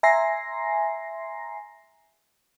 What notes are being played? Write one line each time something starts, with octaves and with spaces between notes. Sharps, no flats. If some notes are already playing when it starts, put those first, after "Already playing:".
E5 G#5 A#5 C6 A#6 C7